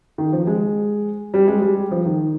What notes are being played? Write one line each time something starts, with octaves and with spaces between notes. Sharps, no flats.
D#3
F3
G#3
G3
G#3
G3
F3
D#3